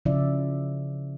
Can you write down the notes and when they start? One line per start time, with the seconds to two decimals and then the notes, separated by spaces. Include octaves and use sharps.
0.06 C#3 F3 C#4 E4 D5 E5